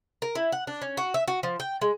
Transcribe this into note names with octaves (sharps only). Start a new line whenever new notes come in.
A#4
E4
F#5
D4
C#4
F#4
E5
F#4
F3
G5
G#3